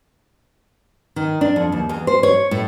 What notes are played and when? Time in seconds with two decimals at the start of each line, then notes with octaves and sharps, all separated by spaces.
1.16 D#3
1.41 D4
1.56 F2
1.72 D#2
1.89 E2
2.07 C5
2.23 C#5
2.51 A2